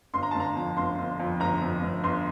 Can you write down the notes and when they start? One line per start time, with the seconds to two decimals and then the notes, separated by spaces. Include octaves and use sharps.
0.14 G1 C6
0.23 A#5
0.31 G1 A5
0.40 A#5
0.56 F2
0.77 G1 C6
0.98 G1
1.19 F2
1.40 G1 A#5
1.61 F2
1.83 G1
2.04 G1 C6